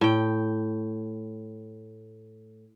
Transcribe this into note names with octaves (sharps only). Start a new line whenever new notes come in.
A2 G5